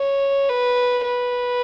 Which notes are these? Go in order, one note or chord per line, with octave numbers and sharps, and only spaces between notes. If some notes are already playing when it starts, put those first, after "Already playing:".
Already playing: C#5
B4
B4